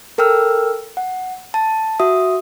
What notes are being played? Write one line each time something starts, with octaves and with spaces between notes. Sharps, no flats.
A4 A#4 G5 E6 F6
F#5
A5
F#4 E5 D#6